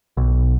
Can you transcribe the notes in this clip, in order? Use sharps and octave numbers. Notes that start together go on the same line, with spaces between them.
B1